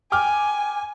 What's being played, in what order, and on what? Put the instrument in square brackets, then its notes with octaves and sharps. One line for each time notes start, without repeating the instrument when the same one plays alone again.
[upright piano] G5 D6 F6 [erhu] G#5